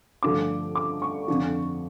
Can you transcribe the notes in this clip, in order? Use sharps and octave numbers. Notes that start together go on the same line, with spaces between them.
G2 D3 F3 A3 D6
D6
C#6
F2 D3 F3